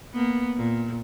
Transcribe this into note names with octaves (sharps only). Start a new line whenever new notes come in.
A#3 B3
A#2